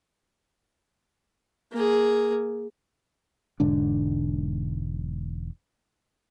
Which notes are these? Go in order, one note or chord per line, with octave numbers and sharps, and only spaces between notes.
A#3 G#4
E1 G#2 D3 D4